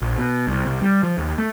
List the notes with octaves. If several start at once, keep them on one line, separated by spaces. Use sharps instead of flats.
A#1
B2
C2
C2
G3
F3
D#2
A3